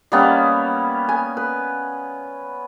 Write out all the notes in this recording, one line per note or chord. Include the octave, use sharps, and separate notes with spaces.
G3 A#3 B3 C#4
G#5
B4